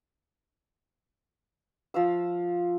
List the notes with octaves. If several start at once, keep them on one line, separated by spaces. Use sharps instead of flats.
F3 F5 E6